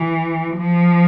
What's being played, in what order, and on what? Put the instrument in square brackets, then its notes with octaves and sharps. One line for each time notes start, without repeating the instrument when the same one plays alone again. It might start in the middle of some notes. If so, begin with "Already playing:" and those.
Already playing: [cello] E3
F3